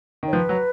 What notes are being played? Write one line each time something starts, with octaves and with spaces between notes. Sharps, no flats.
D#3 C#5
F3 B4
F#3